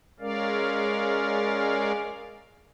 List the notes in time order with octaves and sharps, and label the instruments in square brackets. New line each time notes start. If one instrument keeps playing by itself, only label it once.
[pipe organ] G#3 C#4 A#4 D5 F5